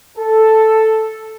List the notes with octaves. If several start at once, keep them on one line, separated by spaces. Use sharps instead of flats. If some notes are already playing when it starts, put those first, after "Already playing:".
A4